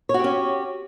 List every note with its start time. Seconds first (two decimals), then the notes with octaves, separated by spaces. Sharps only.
0.09 C#5
0.14 F#4
0.19 G4
0.24 C#4